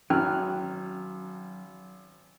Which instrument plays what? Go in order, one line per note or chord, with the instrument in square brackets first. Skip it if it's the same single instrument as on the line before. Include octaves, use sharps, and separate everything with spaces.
[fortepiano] G#1 F6 F#6 [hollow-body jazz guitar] F#3 [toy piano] C#4